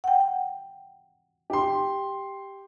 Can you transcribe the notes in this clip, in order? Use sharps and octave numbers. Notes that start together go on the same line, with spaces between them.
F#5 G5
G4 C6